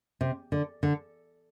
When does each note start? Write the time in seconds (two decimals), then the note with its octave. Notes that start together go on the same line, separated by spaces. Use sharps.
0.21 C3
0.52 D3
0.83 D3